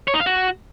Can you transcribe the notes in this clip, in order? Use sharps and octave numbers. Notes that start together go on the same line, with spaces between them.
C#5
D#4
F5
F#4